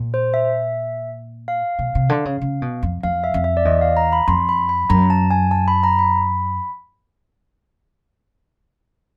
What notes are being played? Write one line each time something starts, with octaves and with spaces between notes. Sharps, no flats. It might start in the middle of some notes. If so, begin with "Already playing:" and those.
Already playing: A#2
C5
E5
F5
B2
C3
D3
C#3
C#3
B2
F2
F2 F5
E5
F2
E5
D5
E2 D#5
F5
A#5
B5
F2 C6
B5
B5
F#2 A#5
A5
G#5
A5
B5
A#5
B5